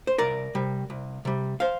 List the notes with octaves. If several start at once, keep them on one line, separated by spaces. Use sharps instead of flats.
C5
C2 A#4 D5
C3 G3
C2
C3 G3
C5 F5